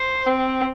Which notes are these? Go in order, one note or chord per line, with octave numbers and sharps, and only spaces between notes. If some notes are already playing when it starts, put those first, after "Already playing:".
Already playing: C5
C4